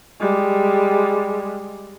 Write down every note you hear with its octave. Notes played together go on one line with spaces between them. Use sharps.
G3 G#3